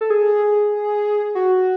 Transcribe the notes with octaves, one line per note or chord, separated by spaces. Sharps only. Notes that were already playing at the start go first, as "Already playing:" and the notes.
A4
G#4
F#4